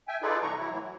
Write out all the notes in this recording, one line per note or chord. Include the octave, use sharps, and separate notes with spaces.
E5 G5 G#5
D#4 F4 G#4 A4 B4 D5
C3 E3 G3 A#5 C#6
E3 F#3 E4
A2 E3 F#3
F#3